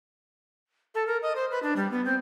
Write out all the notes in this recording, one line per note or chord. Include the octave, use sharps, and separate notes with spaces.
A4
A#4
D#5
C5
B4
D4
G3
B3
C4